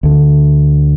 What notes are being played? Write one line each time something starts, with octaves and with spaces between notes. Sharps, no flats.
D2 D3